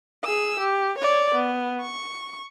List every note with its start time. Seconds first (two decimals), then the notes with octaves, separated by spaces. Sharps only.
0.25 G#4 E6
0.59 G4
0.98 C#5 D5
1.34 B3
1.81 C#6